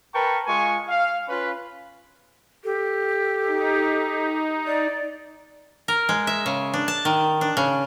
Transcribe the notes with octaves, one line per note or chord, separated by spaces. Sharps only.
A#4 B4 G5 A5 C#6
G#3 F4 G#5 C#6
F5
C#4 F4 B4 B5
G4 A4
D#4
D5
A#4
G#3
E5
C#3
D4
A5
D#3
D4
C#3